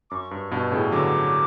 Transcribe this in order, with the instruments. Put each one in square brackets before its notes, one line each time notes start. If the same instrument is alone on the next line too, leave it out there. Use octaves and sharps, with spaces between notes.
[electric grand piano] F#2 [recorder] D6
[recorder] C#6
[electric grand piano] G2
G2 B2
A2 C#3
[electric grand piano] D3 F#3 [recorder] D6